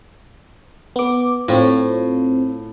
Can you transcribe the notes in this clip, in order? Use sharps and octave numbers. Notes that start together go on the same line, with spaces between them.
B3 D6
A2 C4 F4